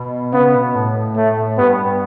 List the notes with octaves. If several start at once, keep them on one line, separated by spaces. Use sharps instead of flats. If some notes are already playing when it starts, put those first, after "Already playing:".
Already playing: B2
C#3 B3
B2
A2
A3
G2 B3